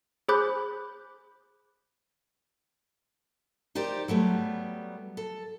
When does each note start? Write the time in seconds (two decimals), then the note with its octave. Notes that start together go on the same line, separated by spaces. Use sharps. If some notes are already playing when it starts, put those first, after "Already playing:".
0.29 G#4 C5 B5 D6 F#6 G6
3.75 D#4 G4 A#4 C5 D5
4.08 F#3 G3 A3 B3
5.17 A4